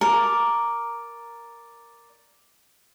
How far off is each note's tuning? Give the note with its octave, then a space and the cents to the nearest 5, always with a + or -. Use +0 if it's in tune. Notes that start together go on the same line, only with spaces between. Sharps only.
A#4 +0 D5 +0